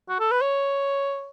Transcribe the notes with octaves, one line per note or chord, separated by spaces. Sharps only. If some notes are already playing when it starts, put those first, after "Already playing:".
F#4
A4
B4
C#5